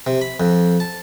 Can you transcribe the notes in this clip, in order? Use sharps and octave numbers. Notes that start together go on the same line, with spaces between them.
C3
B5
F2
A5